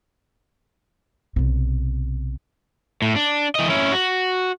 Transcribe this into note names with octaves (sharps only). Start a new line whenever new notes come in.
B1 C3
A2
D4
E3 D#5
C#4 E4
F#4